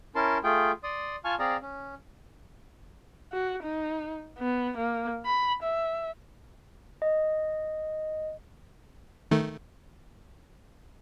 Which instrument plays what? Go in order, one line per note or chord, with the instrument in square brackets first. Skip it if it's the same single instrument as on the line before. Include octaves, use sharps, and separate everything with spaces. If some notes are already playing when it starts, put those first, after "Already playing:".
[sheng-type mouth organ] C#4 E4 A#4 A5 C6
A3 F4 G#4 G5
D5 C6 D#6
F4 F5 G#5 A5 C#6 F6
C4 G#4 D5 F5 A#5
C#4
[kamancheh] F#4
D#4
B3
A#3
B5
E5
[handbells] D#5
[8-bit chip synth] D#3 A3